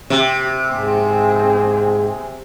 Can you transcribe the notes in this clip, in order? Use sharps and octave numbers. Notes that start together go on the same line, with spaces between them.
C3 G4
G#2 C4 G#4